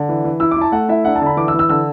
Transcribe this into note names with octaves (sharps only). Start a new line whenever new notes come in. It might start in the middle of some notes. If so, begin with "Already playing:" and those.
Already playing: D3
E3
E3
E4 E6
E4 D6
A5
A3 F#5
E4 E5
D4 F#5
A5
D3 B5
E3 D6
E6
E3
E6
D3 E6